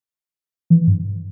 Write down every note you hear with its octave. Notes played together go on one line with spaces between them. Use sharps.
E3
G2